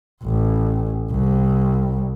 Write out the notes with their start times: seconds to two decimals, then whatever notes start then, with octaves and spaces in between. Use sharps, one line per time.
0.23 A1
1.11 C2